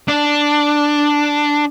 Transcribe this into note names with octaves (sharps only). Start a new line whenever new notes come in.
D4